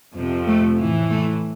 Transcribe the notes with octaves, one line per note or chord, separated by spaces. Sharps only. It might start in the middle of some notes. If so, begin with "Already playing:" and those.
F2 C3 F3
A3
A2 E3
A3